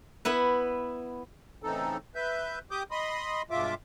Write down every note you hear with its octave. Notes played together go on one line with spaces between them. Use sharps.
B3 E4 B4
A2 C#3 E3 C4 D#4 A4
B4 E5 G6
G4 D6 D#6 G6
D#5 B5 C6 D#6
G2 B2 G#3 F4 E5 D6